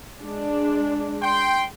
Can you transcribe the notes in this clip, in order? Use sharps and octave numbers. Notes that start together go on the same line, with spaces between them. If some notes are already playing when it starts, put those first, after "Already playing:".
G#3 D4
G5 C6